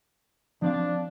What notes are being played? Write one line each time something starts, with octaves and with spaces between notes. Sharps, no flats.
F3 C4 D4 F5